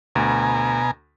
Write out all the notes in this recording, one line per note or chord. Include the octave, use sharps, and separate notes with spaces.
D2 B2 G#5 A#5